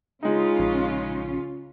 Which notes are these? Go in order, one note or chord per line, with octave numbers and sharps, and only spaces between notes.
C#3 G#3 C#4 D#4 F4
A#1